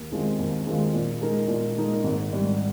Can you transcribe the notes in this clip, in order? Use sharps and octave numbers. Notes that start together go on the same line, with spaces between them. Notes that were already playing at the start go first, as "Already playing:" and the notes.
Already playing: D#2
D#3 G#3 C4 F4
D#2
D#3 G#3 C4 F4
A#2
G#3 D#4 A#4
A#2
G#3 D#4 A#4
G#1
G#2 G3